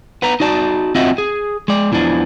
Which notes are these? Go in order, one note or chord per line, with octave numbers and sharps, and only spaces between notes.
B3 B4 A#5
D#4 F#4 D5 A5
C4 F4 F#4 D#5 E5 F#5
G#4
G#3 D5
E2 E3 F3 D4